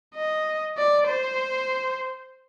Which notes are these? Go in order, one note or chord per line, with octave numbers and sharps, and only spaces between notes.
D#5
D5
C5